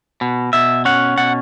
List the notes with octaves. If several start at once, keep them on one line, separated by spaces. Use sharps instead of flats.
B2
B2 E5
C#4 F#5
B2 F#5